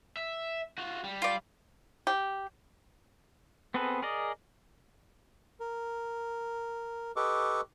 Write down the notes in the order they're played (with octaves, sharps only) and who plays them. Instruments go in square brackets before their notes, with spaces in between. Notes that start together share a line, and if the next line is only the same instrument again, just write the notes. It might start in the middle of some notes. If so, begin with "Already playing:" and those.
[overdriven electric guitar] E5
F4 F#4
G3
[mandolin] F4 D5
[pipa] G4
[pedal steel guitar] B3 C4 G#4 A4 B4
G#4 A#4 D5 D#5
[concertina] A#4
G4 A4 B4 D#5 C#6 D6